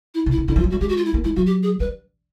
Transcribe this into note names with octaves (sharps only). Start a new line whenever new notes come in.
E4
C3
E4
C#3
D3 E4
F3
F4
F#3
G3 F#4
G#3 G4
F#4
F4
E4
A#3
G#3 E4
F#3 F#4
G4
G#4
G3 B4